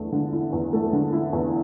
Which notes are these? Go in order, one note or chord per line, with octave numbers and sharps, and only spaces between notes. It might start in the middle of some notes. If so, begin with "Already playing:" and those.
Already playing: E2 D3 A3
D3
E4
E2
A3
D3
E4
E2